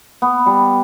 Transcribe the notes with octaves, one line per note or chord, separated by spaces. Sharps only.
B3
G3